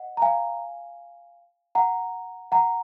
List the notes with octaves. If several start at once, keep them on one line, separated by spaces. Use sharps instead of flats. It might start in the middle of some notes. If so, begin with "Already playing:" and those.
Already playing: D#5 F#5
A#5
F5 G#5
F#5 A#5
F#5 A#5